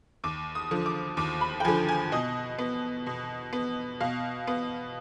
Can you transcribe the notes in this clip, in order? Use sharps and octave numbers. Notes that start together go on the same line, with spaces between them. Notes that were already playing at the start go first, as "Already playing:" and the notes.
D#2 D6
D#6
D3 F3
D6
D#2 D6
B5
G5
D3 F3 G#5
G#5
B2 D#5
B3
B2
B3
B2 F5
B3